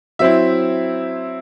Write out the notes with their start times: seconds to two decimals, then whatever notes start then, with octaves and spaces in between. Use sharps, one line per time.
0.19 F#3 C4 E4 E5